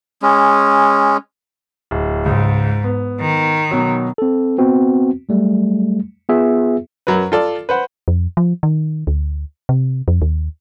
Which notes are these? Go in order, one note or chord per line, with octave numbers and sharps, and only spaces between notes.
G#3 C#4
D1
C#2 G#2
B3
D#3
B2 F#3
C4 A4
B3 C4 F#4
F#3 G3 A3
B3 F4 G#4 E5
F#2 F#3 A#4 B4
F4 A4 D5
B4 C5 F#5
F2
F3
D#3
D2
C3
F2
D#2